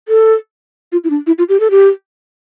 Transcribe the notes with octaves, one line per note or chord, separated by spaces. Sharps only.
A4
F4
E4
D4
E4
F4
G4
A4
G4